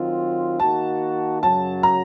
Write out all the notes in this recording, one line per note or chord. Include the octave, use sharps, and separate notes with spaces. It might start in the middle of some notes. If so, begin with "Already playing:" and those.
Already playing: D#3 F#3 C4 F4
D#3 A#3 D#4 F#4 A5
F#2 C#3 F#3 A5
A#5